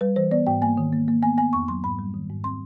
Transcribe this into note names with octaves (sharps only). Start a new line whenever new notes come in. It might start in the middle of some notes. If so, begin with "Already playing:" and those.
G3 B4
E3 C5
B3 D5
G#2 G5
A#3 G#5
D#3
A#3
A#3
B3 G#5
B3 G#5
F2 C#6
F#3 C6
G#2 B5
G3
D#3
G#2
C4 C6